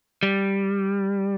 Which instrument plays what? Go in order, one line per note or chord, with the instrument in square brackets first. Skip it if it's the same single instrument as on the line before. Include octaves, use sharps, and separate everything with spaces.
[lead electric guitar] G3